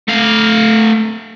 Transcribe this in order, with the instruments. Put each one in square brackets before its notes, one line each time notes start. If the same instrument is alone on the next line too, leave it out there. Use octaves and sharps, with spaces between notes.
[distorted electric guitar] A3 F5